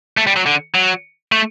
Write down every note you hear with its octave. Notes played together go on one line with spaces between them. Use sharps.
A3
G3
F#3
D3
F#3
A3